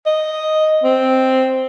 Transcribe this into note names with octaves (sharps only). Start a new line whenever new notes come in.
D#5
C4